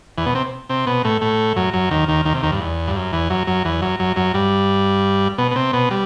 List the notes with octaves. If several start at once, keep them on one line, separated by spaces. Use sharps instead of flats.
E2 E3
B2 B3
C3 C4
C3 C4
B2 B3
A2 A3
A2 A3
F#2 F#3
F#2 F#3
D#2 D#3
D#2 D#3
D#2 D#3
C3
D#2 D#3
G2
E2
G2
F#2
E2 E3
F#2 F#3
F#2 F#3
E2 E3
F#2 F#3
F#2 F#3
F#2 F#3
G2 G3
B2 B3
B3
C3 C4
B2 B3
G3